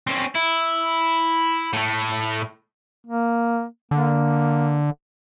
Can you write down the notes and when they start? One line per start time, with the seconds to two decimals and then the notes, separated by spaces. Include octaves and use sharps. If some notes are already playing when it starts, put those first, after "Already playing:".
0.07 C4 C#4
0.35 E4
1.73 A2 A3
3.07 A#3
3.91 D3 A#3